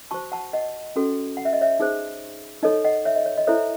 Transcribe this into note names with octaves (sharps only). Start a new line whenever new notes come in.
F#4 C5 A5 C#6
F#5 A5
D#5 F#5
C#4 F#4 A4
F#5
E5
D#5
C#5 E5
D#4 G#4 C5
D#4 A4 C#5 D#5
D#5 F#5
C#5 E5
D#5
C#5
D#5
E4 A4 C5 C#5 E5